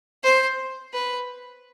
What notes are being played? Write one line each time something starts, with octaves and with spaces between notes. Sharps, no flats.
C5
B4